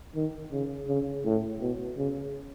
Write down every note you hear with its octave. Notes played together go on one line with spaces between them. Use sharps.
D#3
C#3
C#3
A2
B2
C#3